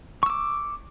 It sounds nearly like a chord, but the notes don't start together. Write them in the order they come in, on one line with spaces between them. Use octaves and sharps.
C#6 E6 D6